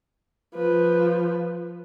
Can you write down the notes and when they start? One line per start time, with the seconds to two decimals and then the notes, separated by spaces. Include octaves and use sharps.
0.55 F3 B4